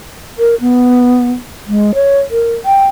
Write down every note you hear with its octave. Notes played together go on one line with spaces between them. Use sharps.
A#4
B3
G#3
C#5
A#4
G5